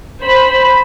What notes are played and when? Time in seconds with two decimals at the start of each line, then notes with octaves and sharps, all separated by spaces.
0.21 C5 B5